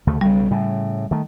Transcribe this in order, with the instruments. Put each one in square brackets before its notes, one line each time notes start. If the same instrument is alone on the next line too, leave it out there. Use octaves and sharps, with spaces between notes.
[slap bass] D2 C#3 A3
[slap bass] B1 C#3 [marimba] G3
[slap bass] A2 C#3
D#3 A3